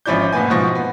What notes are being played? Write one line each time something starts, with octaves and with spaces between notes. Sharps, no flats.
G#1 F3 C#4 E4 D5 G6
F#1 A2 B3 B4 G#5
G#2 B2 F3 C#6 A#6
B3